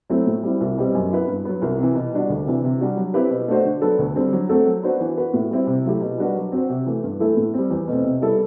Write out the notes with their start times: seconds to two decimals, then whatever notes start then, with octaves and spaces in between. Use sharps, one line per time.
0.10 F#3 A3 C4 E4
0.27 A2
0.43 G3 C4 E4
0.61 C2
0.77 B2 G3 C4 G4
0.94 F#2
1.11 F#3 B3 E4 B4
1.28 G2
1.45 F#3 B3
1.62 C2
1.79 C3 E3
1.95 B2
2.13 G3 D4 F#4
2.30 D2
2.46 C3 E3
2.64 C3
2.81 G3 D4 F#4
2.97 F#3
3.14 C4 E4 G4 B4
3.31 B2
3.48 A3 D4 F#4 C5
3.65 D3
3.81 F#3 B3 D4 A4
3.99 D2
4.16 D3 G3 C4
4.33 F#3
4.49 A3 C4 F#4 A4
4.66 F#3
4.83 B3 D4 F#4 C5
5.01 E3
5.17 B3 F#4 B4
5.33 A2
5.51 G3 C4 E4
5.67 C3
5.85 F#3 A3 E4 G4
6.01 B2
6.18 G3 D4 F#4 B4
6.35 F#3
6.52 C4 F#4 C5
6.70 C3
6.86 E3 A3
7.04 G2
7.20 E3 A3 E4 A4
7.37 A2
7.54 G3 C4
7.71 E2
7.88 B2 A3 C4
8.04 C3
8.22 G3 B3 E4 A4